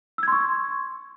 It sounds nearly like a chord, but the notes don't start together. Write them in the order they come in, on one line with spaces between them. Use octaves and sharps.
E6 G#6 C6 C#6